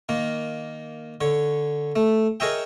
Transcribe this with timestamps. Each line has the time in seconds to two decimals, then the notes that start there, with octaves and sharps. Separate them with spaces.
0.09 D#3 A#3
1.21 D3 C#5
1.96 A3
2.40 G#4 A#4 C#5 D#5 E5 G5